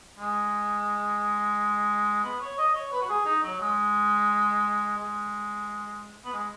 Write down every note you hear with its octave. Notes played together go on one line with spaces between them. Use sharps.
G#3
B3
C#5
D#5
C#5
B4
F#4
G#4
D#4
F#3
G#3
G#3
B3
G#3